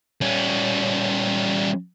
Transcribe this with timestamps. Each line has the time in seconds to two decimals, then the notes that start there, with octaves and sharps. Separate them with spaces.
0.21 G3 C#4